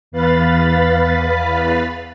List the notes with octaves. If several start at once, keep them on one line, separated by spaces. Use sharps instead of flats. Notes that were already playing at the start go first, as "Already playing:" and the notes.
E2 B4 F5 B5 A6